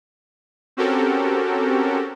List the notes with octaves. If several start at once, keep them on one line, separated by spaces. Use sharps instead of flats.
C4 C#4 F#4 G4 A4 A#4